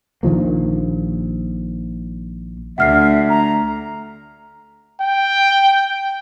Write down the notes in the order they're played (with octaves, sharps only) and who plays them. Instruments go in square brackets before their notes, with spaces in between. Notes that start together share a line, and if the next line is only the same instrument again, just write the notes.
[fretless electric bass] A#1 D#3 F3 A#3
[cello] D2 [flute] E5 [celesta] F#5 F6 C7
[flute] A#5
[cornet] G5